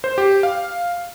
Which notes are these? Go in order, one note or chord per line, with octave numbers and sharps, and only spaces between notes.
C5
G4
F5